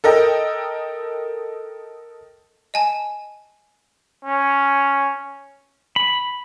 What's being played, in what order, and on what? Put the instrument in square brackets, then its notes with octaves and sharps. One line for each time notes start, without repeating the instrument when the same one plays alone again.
[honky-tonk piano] A4 A#4 D#5 G5
[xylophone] D#5 G#5 A5
[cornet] C#4
[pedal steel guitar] B5